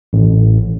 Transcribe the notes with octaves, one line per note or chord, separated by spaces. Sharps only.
A1